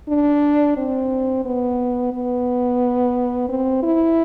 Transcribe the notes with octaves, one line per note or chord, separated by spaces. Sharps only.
D4
C4
B3
B3
C4
E4